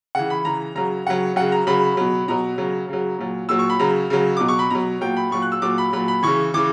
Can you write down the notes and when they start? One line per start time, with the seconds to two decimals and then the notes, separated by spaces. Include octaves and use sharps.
0.15 C#3 E3 F#5
0.30 B5
0.45 C#3 E3 A#5
0.75 C#3 F#3 A#5
1.07 C#3 F#3 F#5
1.36 C#3 F#3 F#5
1.52 A#5
1.67 C#3 F#3 B5
1.97 B2 F#3
2.28 B2 F#3 A#5
2.58 C#3 F#3
2.89 C#3 F#3
3.19 A#2 F#3
3.49 A#2 F#3 E6
3.59 C#6
3.70 B5
3.79 C#3 F#3 A#5
4.10 C#3 F#3
4.37 B2 F#3 D6
4.48 C#6
4.59 B5
4.70 B2 F#3 A#5
5.01 A#2 F#3 G5
5.17 B5
5.31 A#2 F#3 C#6
5.42 F#6
5.52 E6
5.62 A#2 F#3 D6
5.78 B5
5.93 A#2 F#3 B5
6.08 B5
6.23 C#3 E3 C#6
6.54 C#3 E3 D6